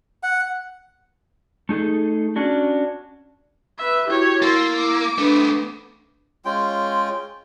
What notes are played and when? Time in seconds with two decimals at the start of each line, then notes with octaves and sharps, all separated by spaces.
0.23 F#5
1.69 A3 D#4 G#4 A4
2.36 C#4 D4 F#4
3.78 B4 E5
4.07 E4 F#4 G4 C#5
4.42 A#3 E4 C6 E6 A6
4.76 D6
5.18 A3 B3 D4 B4 D#6
6.45 G#3 C#4 F4 G5